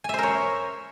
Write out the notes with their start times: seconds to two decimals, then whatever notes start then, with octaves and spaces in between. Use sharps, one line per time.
0.04 G#5
0.09 E5
0.14 C5
0.18 A#4
0.23 C#5